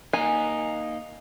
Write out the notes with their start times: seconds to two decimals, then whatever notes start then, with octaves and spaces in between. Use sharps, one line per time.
0.13 A#3 D#4 G#5